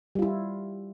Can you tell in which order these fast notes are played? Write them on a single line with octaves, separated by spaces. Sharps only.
G3 F4 E4